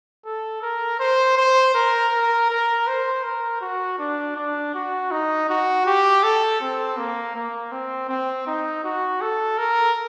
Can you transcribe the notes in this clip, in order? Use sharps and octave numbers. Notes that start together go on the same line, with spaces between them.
A4
A#4
C5
C5
A#4
A#4
A#4
C5
A#4
F#4
D4
D4
F#4
D#4
F#4
G4
A4
C4
A#3
A#3
C4
C4
D#4
F#4
A4
A#4